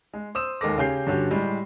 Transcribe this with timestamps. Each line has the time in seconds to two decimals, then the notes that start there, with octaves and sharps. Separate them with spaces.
0.14 G#3
0.35 C5 D#6 E6 E7
0.61 D#2 G#3 A4 A#4 D6 A#6
0.78 C#3 C#4 G4 G#4 G6 C7
1.07 G2 D3 C#4 F#4 G4
1.31 A2 G3 G#3